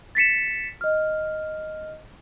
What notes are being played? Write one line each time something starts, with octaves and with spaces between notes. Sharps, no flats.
A6 B6 C#7 E7
D#5 F6